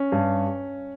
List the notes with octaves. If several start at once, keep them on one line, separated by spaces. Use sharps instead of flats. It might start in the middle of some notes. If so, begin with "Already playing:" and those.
Already playing: C#4
G2